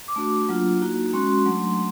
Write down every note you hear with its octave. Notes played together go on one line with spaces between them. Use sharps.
D6
A3 D4 F#4
F#3 A#3 D4 F4
A#3 D#4 F#4
G#3 C#4 F#4 C6
F#3 A3 D4